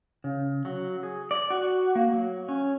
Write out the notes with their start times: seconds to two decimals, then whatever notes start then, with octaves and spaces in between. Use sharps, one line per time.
0.24 C#3
0.65 F#3
1.03 G#4
1.31 D5
1.51 F#4
1.95 A#3
2.13 F#3
2.49 C#4